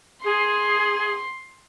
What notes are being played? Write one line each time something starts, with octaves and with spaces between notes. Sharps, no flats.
G#4 C6